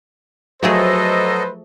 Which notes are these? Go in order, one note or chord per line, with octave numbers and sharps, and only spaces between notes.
F3 F#3 A3 G#4 A4 B4 C5 D#5